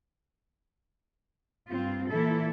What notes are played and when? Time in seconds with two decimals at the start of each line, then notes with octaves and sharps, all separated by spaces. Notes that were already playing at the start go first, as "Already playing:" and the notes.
1.70 G2 C4 F4
2.13 A#2 E3 E4 A4